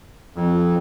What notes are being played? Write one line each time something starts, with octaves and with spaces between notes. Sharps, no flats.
F2